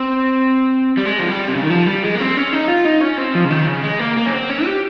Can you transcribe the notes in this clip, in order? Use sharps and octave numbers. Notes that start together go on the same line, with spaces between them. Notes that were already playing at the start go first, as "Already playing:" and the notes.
Already playing: C4
G3
G#3
F3
G3
C3
C#3
D#3
F3
G3
G#3
A#3
C4
C#4
D#4
F4
D#4
C#4
C4
F3
C#3
D#3
C#3
G#3
A#3
A#3
C#4
C4
C#4
G4